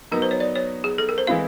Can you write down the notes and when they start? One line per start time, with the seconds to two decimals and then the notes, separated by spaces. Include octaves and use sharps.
0.11 F#3 B3 D#4 A#4
0.22 C5
0.31 C#5
0.40 D5
0.56 C#5
0.84 G#4
0.98 A4
1.09 A#4
1.18 C5
1.27 E3 G#3 C4 E4 F5